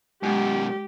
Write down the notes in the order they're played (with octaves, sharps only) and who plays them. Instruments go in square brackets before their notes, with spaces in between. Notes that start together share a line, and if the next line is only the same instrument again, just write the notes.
[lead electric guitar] F#2 B2 [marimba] G#3 [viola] G4